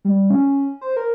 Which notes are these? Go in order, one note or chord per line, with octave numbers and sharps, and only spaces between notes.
G3
C#4
C5
A#4